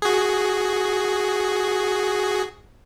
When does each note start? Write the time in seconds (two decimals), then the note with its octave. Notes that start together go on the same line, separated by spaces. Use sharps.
0.02 F#4 G#4